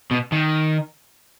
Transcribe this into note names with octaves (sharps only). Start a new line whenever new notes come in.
B2
D#3